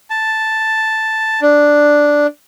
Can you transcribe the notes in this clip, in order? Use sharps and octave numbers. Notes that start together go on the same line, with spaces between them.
A5
D4